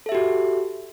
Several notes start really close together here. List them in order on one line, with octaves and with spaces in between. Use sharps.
A4 E5 G4 F#4